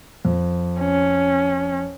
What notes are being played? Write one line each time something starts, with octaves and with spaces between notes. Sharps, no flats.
F2
C#4